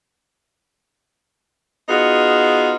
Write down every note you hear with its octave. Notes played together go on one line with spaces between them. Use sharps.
B3 D#4 F4 F#4 G#4